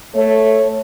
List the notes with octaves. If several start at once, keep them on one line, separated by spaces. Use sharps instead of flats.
A3 C#5